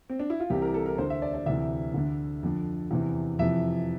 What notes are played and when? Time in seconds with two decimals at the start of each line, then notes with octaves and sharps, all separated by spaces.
0.10 C4
0.19 D4
0.30 E4
0.40 F4
0.50 C2 C3 E3 G4
0.62 A#4
0.74 A4
0.86 A#4
0.98 D2 D3 C5
1.10 E5
1.22 D5
1.34 D5
1.46 D2 C3 E3 E5
1.94 D2 D3
2.43 F2 D3
2.91 E2 C3 E3
3.39 F2 C3 E3 E5